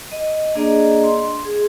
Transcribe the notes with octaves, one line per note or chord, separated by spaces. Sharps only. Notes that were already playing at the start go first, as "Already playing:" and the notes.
D#5
A#3 D4 G#4 D5 D#5 A#5
C6
G#4